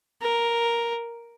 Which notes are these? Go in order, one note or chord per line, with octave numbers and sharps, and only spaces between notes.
A#4